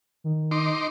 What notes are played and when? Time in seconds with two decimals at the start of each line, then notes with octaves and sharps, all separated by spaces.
0.24 D#3
0.51 D#4 C6 D6